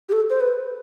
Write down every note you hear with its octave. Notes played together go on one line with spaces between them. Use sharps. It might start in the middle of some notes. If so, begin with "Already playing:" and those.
G4
A4
C5
B4